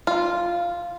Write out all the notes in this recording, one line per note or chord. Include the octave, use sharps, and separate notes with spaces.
F4